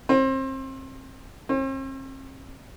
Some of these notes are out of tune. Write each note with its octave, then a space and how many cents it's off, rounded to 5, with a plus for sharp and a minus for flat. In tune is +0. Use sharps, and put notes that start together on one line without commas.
C4 +30
C4 +45